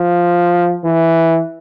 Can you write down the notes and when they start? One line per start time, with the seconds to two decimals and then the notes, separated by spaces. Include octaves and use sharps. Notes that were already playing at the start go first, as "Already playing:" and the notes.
Already playing: F3
0.84 E3